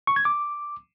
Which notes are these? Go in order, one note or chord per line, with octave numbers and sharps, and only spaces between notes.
C#6
G#6
D6